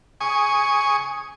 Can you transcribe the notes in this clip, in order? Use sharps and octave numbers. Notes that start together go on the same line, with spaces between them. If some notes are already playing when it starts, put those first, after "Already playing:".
G#5 C#6 D#6